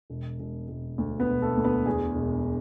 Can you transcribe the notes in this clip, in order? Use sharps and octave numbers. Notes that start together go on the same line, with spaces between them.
E1
E1
E1
D2
B3 B4
E1
A3 A4
D2
B3 B4
E2 G#4
E1